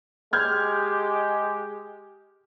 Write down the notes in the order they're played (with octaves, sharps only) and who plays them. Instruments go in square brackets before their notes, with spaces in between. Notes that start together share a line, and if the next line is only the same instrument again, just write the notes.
[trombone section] G#3 G4 [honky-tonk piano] F6 G6 G#6